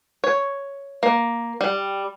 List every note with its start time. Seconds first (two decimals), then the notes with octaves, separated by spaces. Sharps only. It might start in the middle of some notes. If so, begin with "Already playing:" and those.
0.24 C#5
1.03 A#3
1.61 G3